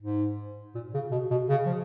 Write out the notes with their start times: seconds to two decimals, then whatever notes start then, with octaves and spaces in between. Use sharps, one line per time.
0.02 G#2
0.75 A#2
0.94 C#3
1.11 B2
1.31 B2
1.49 C#3
1.66 F3